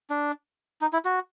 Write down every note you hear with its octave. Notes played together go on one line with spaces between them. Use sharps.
D4
D#4
E4
F#4